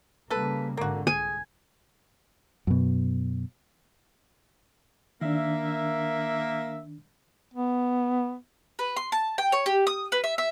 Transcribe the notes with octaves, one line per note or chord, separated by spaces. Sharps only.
C#3 G3 A#3 A4 B4
G#1 G#2 D3 A#3 F#4
C2 G#4 G#5
F#2 B2
D#3 A#3 D4 E5
B3
B4
C6
A5
G5
C#5
G4
D#6
B4
E5
E5